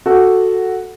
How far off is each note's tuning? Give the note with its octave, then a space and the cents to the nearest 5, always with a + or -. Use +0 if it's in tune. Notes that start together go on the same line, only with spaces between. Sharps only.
F#4 +0 A4 +0